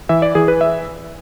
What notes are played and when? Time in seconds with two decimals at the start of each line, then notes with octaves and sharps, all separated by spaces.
0.09 E3 E5
0.22 D5
0.35 E3 G#4
0.48 B4
0.61 E5